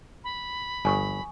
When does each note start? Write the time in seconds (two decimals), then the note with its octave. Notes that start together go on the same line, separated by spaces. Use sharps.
0.24 B5
0.85 G1 G#5 C#6 D#6